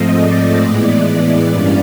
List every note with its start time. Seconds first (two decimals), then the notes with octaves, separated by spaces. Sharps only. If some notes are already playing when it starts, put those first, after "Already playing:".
Already playing: G#2 F3 A3 C4 D#5
0.18 D5
0.62 A2 E3 G#3 B3 D5
1.50 G2 E3 G3 A#3 C#4 D5